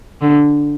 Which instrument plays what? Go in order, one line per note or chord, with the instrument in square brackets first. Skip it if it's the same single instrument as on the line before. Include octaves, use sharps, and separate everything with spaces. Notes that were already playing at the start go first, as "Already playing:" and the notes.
[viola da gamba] D3